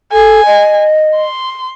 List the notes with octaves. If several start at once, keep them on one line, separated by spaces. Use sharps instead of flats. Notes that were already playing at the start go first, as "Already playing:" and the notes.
A4 G#5
D#5
C6